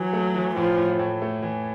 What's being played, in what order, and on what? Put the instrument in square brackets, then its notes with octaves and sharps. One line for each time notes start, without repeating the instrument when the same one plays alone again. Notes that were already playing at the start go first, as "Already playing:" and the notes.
Already playing: [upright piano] E3 [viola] F#3
[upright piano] A3
E3
[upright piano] A2 [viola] F3
[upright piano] A2
A2
A3
E3